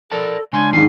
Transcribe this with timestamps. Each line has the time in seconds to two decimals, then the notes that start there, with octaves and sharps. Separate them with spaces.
0.12 A4 A#4 D5 A5
0.53 C#3 G#3 D4 G#5 C6
0.73 F2 G#2 D#3 C#4 G#5 C7